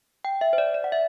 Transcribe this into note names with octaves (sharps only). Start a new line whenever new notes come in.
G5
E5
C5
D5
D5
F#5
E5